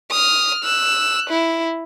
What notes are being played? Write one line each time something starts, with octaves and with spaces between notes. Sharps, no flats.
D#6 F6
E6 F#6
E4